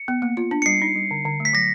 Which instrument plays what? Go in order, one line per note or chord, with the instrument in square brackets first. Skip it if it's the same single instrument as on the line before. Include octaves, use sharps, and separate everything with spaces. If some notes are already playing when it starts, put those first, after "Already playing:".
Already playing: [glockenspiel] C#7
[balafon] B3
A#3
F4
D4
[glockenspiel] C#7
[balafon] G3 [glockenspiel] C7
[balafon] D#4
G3
D3
D3
A3
[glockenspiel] B6
[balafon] F#3 [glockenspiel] A#6